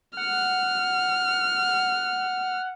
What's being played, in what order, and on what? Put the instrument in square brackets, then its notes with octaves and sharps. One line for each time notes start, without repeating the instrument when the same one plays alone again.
[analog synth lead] F#5 [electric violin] F6